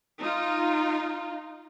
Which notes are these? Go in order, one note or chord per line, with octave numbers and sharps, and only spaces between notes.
D#4 F4